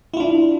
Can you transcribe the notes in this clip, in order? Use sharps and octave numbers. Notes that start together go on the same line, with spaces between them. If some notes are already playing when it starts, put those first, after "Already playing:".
D4 E4 F4